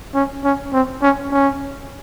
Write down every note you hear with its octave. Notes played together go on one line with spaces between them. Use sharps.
C#4
C#4
C4
C#4
C#4